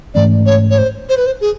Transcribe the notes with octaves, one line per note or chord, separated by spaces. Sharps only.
G#2 E3 A3 C#4 D5
C#5
C#5
C5
C5
B4
C5
G#4